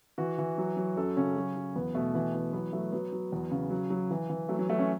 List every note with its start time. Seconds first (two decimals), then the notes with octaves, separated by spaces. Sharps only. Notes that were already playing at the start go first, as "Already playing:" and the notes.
0.18 E3 F#4
0.38 E3
0.58 F#3
0.77 F#3
0.96 F#2 A4
1.17 C#3 C#4
1.36 F#3
1.56 F#3
1.76 E2 B3
1.95 B2 A3
2.14 E3
2.34 E3
2.53 F#3 B3
2.73 F#3 A3
2.92 F#3 B3
3.12 F#3
3.32 E2
3.51 C#3
3.70 F#3
3.90 F#3
4.11 E3
4.30 E3
4.49 F#3 A3
4.59 F#3
4.69 F#3 A3
4.79 C#4